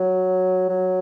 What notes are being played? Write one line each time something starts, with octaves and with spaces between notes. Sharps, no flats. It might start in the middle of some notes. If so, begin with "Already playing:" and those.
Already playing: F#3
F#3